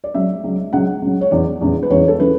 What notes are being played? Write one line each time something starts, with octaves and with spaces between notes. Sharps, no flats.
D5
C#2 C#3 F#3 E5
C#2 C#3 F#3
C#2 C#3 F#3 F#5
C#2 C#3 F#3
C#5
E2 C#3 E3 D5
E2 C#3 E3
B4
E2 C#3 E3 C#5
A4
C#3 E3 B4